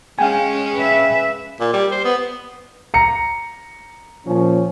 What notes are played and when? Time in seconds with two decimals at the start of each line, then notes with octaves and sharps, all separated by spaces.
0.19 G#3 C#4 F5 G5 G#5
0.75 B4 E5
1.60 A#2
1.73 G3
1.92 C5
2.04 B3
2.94 A#5 C#7
4.27 A#2 F3 C#4